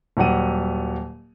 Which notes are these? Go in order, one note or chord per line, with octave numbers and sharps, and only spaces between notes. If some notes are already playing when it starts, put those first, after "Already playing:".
D#1 F#3 G3 F#5 D#7